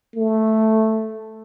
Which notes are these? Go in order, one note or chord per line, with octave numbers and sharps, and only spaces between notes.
A3